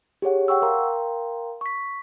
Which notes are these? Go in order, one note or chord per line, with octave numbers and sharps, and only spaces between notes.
G4 G#4 C#5 F#5
F#5 G5 C#6 E6
A#4 F5 G5 A#5 C6
C#6 B6